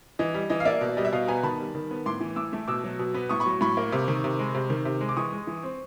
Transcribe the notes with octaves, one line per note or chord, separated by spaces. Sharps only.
E3 D#5
G3
E3 D#5
F5
A#3 D5 E5
B2
G3 D#5
E5
B2 D#5 F5
B3 G#5 A#5
D#3 A5 B5
G3
D#3
B3
A2 C6 D6
E3
A2 D6 E6
A3
B2 D6 E6
F#3
B2
B3
A2 C#6 D#6
B5 C#6
F#3
A2 B5 C#6
A#3
C3
D#3
C3
G#3
C3
D#3
C3
G#3
D6
E3 C#6 D#6
G#3
E3
C4